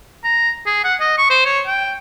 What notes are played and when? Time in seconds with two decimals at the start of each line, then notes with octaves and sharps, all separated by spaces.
0.24 A#5
0.66 G#4
0.84 F#5
1.00 D#5
1.18 C#6
1.30 C5
1.45 C#5
1.66 G5